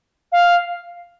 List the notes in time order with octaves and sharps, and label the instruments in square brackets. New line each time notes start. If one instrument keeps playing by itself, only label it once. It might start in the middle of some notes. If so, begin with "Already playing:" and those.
[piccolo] F5